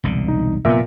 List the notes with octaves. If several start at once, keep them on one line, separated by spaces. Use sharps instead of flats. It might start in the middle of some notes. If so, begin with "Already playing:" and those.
E1 C2 D3
D#4
F1 A#2 B3 A#4 E5